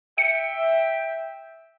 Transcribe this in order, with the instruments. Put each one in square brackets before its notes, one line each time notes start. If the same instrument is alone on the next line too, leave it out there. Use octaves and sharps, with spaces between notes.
[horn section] E5 G5 [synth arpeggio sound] C#7